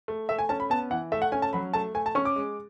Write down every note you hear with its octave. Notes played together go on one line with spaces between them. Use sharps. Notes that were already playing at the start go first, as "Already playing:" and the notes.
A3
A3 E5
G#5
C#4 A5
B5
B3 A5
E3 F#5
A3 E5
F#5
C#4 G#5
A5
F#3 B5
A3 A5
A3 G#5
A5
C#4 C#6
D6
G#3